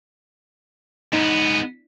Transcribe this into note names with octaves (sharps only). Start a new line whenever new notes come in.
G#2 B3 D#4